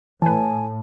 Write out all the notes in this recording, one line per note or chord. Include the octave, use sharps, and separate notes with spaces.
A2 E3 B4 G#5 A5